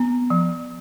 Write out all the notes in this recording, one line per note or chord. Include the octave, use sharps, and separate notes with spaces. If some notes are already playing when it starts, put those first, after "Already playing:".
Already playing: B3 A#5
F3